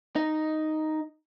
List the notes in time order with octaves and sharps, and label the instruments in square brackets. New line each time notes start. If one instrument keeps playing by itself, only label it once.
[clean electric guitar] D#4